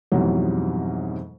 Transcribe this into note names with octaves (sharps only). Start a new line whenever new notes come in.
F2 G#2 B2 E3 F#3 G3